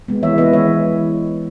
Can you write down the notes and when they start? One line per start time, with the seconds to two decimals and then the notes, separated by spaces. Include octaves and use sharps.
0.08 G#3 B3
0.23 E3 C#5 E5
0.38 G#3 B3 B4 D#5
0.53 E3 C#5 E5